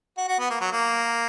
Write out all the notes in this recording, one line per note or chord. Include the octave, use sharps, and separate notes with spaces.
F#4
F#4
B3
A#3
F#3
A#3